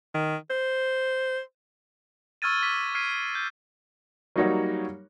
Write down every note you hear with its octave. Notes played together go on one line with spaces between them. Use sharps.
D#3
C5
C#6 E6 F6 G#6 A6 D#7
D6 B6
F6 G#6 B6 C7 D7 D#7
G6
F#3 G3 A#3 D#4 F#4 C#5